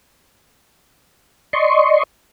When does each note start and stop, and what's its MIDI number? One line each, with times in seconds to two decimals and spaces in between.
1.53 2.03 74
1.53 2.03 75
1.53 2.03 84
1.53 2.03 85